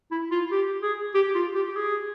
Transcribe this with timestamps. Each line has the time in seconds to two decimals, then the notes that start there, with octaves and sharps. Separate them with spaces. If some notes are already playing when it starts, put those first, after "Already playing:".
0.11 E4
0.31 F4
0.52 G4
0.83 G#4
1.14 G4
1.34 F4
1.55 G4
1.68 G4
1.76 G#4